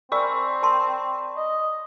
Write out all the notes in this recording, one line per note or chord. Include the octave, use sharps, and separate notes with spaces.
C4 A#4 D5 B5 C#6
A#4 A5 C6
D#5